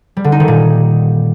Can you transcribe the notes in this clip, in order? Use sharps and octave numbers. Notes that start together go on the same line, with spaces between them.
G3
D3
D#4
D#3
A#2